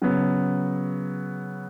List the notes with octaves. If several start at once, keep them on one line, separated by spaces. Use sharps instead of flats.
C#3 F#3 B3